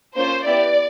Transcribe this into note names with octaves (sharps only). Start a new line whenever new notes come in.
A#3 C#4 F4 C5
B3 E4 G4 D5